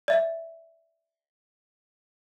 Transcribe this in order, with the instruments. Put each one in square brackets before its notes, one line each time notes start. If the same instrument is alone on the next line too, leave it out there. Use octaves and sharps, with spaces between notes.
[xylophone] D5 E5